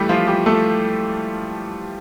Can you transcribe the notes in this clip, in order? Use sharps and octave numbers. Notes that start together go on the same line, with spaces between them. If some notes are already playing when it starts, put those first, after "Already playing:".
Already playing: E3 G3 A3 G4
F3 F4
G3 G4
A3 A4